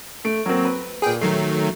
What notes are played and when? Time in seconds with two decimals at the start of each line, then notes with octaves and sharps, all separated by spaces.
0.25 A3 D7
0.46 F#3 A#3 C4
0.65 B4
1.02 A#2 G#4 B4 G5
1.21 D#3 F#3 A3 C7